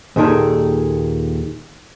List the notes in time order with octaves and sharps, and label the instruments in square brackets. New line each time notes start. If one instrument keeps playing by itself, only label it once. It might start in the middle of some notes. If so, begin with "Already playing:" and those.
[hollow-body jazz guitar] D#2 A#2 D#3 G#4 A4